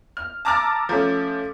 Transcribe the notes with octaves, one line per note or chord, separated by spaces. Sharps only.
F6
A5 A#5 D6 E6 F6 A6
F3 A3 C#4